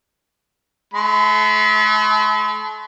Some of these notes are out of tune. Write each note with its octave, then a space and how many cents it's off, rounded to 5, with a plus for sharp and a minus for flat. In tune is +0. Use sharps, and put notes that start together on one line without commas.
A3 -40 B5 +45